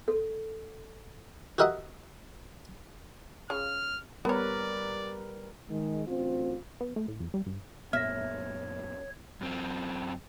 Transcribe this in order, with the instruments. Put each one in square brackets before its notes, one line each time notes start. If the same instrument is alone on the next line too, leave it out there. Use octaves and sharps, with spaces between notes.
[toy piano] A4
[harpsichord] F#4 G4 A#4 D#5 E5 F#5
[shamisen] C#3 F4 [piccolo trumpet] F6
[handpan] G3 A#4 B4 [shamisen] B3 C#5 [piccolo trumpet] D5
[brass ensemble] D#3 G#3
A1 D2 C4 F4
[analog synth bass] B3
A3
A2
F2
G3
G2
[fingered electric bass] F#2 A#2 B3 [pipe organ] C#5 [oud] E5 [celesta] F6 A#6
[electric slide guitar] F#2 C4